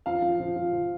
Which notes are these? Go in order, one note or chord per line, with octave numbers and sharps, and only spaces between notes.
F3 F5
F3
F3
F3
F3